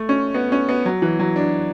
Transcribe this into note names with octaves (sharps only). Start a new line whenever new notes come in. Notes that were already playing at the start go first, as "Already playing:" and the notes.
Already playing: A3
C#4
B3
C#4
B3
F#3
E3
F#3
D4